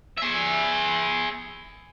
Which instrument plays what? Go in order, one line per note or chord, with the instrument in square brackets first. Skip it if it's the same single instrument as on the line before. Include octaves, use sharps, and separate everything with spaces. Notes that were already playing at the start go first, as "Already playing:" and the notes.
[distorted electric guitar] G#4 E5